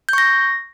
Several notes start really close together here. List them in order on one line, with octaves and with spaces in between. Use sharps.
G6 C#6 A#6